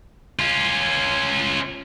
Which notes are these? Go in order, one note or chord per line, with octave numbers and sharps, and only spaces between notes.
C#4 F4